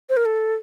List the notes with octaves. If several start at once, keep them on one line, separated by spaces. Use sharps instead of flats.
C5
A#4
A4